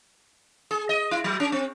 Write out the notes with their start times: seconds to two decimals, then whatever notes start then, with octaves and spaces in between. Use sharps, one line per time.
0.71 G#4
0.89 D#5
1.11 E4
1.24 F#3
1.40 C#4
1.52 C4